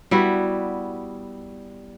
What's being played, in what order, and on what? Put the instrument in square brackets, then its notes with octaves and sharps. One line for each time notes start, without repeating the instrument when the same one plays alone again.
[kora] G3 B3 E4 F#4